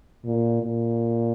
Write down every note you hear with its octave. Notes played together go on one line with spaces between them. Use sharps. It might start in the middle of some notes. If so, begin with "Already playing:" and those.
A#2
A#2